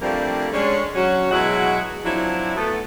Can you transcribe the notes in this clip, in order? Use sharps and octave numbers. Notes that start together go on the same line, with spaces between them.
F3 G3 A3 A#3 C4 D4
G#3 C#4 D4
F#3 C#4 F#4
B2 F#3 G#3 E4 F#4 G#4
F3 F#3 C4 D4 E4
A3 B3 A4